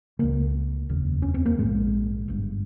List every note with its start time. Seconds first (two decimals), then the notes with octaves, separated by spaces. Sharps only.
0.19 C#2 C#3 A#3
0.89 F1 D#2 C#3
1.22 C#4
1.34 C4
1.46 A#3
1.58 A#1 G#2 G#3
2.28 G1 G2